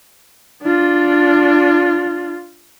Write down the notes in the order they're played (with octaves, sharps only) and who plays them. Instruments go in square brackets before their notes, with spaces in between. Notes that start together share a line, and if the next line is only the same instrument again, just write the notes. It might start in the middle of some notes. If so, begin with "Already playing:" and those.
[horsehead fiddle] D4 F4